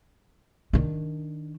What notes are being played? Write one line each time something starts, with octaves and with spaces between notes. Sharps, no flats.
D#3 D4